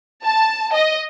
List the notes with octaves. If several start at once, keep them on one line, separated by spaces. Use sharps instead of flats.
A5
D#5